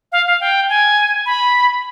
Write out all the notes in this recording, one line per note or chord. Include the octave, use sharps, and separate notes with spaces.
F5
F5
G5
G#5
B5